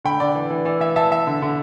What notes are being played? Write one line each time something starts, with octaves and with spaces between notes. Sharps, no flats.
D3 G5 B5
D3 D5
E3
E3
E3 D5
E3 E5
E3 E5 A5
E3 E5
D3
D3